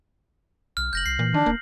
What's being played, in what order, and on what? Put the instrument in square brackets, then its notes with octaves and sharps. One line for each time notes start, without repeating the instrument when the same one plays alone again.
[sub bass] B1 [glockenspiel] F6
[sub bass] F1 [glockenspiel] G6 A#6 F#7
[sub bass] C2 [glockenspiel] C7
[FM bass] A#2 [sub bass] E3
[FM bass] D#3 [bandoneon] D4
[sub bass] D#1 [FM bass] A#3